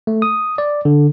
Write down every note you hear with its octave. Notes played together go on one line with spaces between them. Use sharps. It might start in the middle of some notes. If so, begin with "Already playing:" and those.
A3
D#6
D5
D3